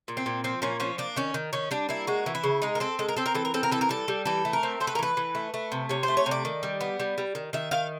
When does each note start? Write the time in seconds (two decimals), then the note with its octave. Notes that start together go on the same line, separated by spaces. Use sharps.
0.08 A#2
0.17 C4
0.26 A#2
0.44 F3 C4
0.62 A#2 C#4
0.80 F3 C#4
0.98 A#3 D4
1.16 D#3 C#4
1.34 D#3
1.53 D#3 C#4
1.71 G3 D4
1.89 A#3 E4
2.07 G#3 F#4
2.26 E3
2.35 E4
2.44 C#3
2.62 G#3 D#4
2.75 A#4
2.80 C4 A4
2.99 G#3 A4
3.08 A#4
3.16 C4 A4
3.26 A#4
3.35 E3 A4
3.45 A#4
3.54 C4 A4
3.63 A#4
3.71 E3 A4
3.81 A#4
3.89 G3 A4
4.08 G3
4.25 E3 A4
4.45 A3
4.53 A#4
4.63 C4
4.80 A3 C5
4.87 B4
4.95 A#4
4.99 E3 B4
5.17 E3
5.35 A3
5.54 A3
5.72 C3
5.89 C3 C#5
6.03 C5
6.08 A3
6.17 C#5
6.26 C3
6.31 D5
6.45 D#3
6.63 G3
6.81 B3
7.00 G3
7.18 G3
7.35 D#3
7.53 D#3 E5
7.71 D#3 F5